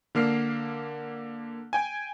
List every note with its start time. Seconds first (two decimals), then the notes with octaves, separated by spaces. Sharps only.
0.15 D3 A#3 F6 C7
1.73 G5 G#5